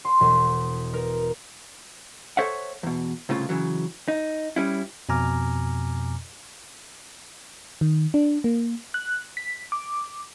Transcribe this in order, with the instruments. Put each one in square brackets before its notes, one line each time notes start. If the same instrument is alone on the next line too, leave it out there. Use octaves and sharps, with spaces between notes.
[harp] C6
E1
A#4
[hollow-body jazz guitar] A4 C5 C#5 E5 F#5
E2 B2
C2 A2 C#3 F4
C#3 E3 F#3
D#4
G3 C#4 E4
[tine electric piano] F2 B2 G#5 A#5 D6 F6
[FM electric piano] D#3
D4
A#3
F#6
B6
D6